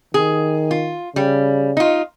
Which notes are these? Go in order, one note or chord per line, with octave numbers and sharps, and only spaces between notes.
D#3 G#4
F4
C#3 G3
D#4 F4